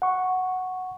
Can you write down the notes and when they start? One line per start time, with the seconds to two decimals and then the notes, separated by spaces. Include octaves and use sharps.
0.02 F#5 C#6